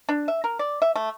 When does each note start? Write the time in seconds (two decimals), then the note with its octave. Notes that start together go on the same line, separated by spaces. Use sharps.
0.09 D4
0.28 E5
0.44 A#4
0.59 D5
0.82 E5
0.96 A3